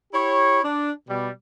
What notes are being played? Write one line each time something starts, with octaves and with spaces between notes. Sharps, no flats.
E4 G4 C#5
D4
B2 G3